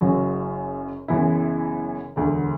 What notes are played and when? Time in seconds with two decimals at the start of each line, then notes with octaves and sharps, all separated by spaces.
0.01 F#1 F#2 C#3 F#3
1.08 F#1 F#2 E3 B3 E4
2.16 E1 D2 D3